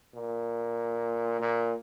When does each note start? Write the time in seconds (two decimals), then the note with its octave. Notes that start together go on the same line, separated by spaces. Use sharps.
0.14 A#2
1.40 A#2